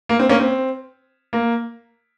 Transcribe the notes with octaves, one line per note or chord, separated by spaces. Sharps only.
A#3
C4
A#3 C#4
C4
A#3